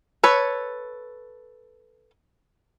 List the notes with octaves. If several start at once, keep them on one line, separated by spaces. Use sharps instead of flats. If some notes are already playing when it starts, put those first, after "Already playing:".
A4 B4 C#5